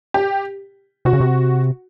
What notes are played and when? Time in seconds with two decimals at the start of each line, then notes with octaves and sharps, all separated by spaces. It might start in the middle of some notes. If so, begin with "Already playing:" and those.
0.14 G4
1.05 C3 F#4
1.13 C#3
1.20 C3